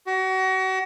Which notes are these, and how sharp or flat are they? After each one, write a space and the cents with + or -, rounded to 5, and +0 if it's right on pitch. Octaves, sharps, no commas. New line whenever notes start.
F#4 +35